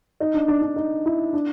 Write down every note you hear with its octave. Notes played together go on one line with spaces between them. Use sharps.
D#4
D4
D4
D4
D#4
E4
D4